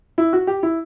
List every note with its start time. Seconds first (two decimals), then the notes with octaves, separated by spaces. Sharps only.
0.18 E4
0.33 F#4
0.47 G4
0.63 E4